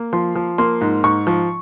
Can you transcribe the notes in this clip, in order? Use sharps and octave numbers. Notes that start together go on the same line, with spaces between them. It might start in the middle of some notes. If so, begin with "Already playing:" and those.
Already playing: A#3
F3 C6
F3
A#3 C6
G#2
G#2 C#6
F3